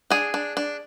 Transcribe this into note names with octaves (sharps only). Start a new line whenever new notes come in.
D4 G#4
D4
D4